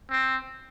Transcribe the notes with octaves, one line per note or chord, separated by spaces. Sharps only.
C4